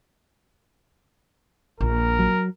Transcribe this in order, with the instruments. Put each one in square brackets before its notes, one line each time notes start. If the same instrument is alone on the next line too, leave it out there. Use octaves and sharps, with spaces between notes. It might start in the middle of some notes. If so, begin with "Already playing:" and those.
[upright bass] A#1 [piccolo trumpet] A#4
[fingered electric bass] F#3